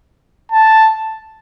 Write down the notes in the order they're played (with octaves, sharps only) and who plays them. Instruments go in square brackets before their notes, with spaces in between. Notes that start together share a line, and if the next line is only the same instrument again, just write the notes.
[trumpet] A5